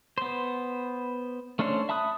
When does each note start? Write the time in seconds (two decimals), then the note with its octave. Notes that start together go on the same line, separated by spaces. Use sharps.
0.18 B3 C5
1.59 A3 C#4 D4 C5 C#5
1.89 E5 A5 B5 D#6 F#6